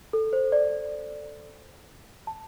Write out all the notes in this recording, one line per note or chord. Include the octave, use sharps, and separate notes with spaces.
A4
C5
D5
A5